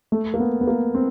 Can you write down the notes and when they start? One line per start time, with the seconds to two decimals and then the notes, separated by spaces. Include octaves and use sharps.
0.12 A3
0.34 A#3
0.40 B3
0.61 B3
0.67 A#3
0.95 C4